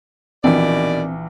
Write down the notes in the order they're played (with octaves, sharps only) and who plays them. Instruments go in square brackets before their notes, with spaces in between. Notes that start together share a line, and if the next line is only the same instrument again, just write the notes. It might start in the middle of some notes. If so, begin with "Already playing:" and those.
[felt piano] A#1 E3 [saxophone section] B2 D#3 D5 [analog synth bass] C4